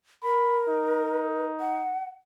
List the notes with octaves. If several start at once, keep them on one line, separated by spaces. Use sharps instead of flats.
A#4 B5
D#4
F#5